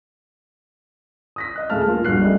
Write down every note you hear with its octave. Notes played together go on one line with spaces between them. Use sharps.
D#6 A#6 B6
D#5 F#6
D#1 A3 G#4 F5 A5 F6
A#3 F4
A#1 G2 F#4 F#6 C7
G3 A3 D#5